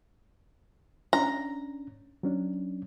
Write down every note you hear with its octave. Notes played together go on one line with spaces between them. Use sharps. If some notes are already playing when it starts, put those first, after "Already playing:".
C#4 D4 A#5
F#3 C#4 D4